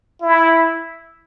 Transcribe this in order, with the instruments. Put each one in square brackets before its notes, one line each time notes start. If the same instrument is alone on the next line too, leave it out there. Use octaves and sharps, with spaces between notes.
[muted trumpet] E4